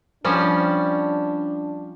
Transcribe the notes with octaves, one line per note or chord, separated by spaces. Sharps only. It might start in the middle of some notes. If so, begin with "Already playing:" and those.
F3 G3 C#4 D4